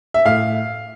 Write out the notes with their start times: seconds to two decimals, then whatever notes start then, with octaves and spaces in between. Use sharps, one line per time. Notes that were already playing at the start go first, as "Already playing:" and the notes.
0.14 E5
0.25 A2 F5